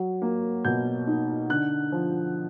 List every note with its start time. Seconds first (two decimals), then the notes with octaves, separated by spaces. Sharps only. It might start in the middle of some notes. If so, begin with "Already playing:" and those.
Already playing: F#3
0.22 A#3
0.65 B2 G6
1.07 D#4
1.50 D3 F#6
1.92 F3